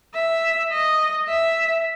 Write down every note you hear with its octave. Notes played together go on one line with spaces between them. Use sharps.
E5
D#5
E5